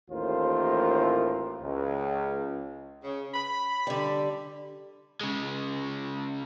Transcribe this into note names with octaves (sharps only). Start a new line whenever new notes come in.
A1 D#2 A2 F4 A#4 C5
C#2
C#3
B5
D3 G3
C#3 G#3